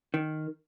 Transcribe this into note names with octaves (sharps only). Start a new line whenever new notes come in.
D#3